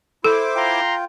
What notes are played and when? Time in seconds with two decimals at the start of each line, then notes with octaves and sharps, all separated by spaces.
0.24 E4 A4 C5 D6
0.55 F4 G5 A#5 C6